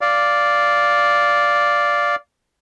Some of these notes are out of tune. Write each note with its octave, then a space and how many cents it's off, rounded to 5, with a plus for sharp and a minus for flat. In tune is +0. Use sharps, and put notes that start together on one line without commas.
D5 -5 F5 +0